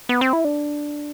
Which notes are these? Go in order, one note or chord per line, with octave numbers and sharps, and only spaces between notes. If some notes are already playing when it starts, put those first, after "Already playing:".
B3
C4
E4
D4